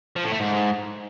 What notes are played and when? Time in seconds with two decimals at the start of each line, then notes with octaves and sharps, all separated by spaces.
0.16 F3
0.24 A2
0.32 A3
0.40 G#2